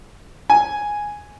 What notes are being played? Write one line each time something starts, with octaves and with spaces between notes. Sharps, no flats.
G#5